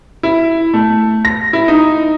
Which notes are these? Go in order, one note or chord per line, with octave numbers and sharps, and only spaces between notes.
E4
A3
A#6
E4
D#4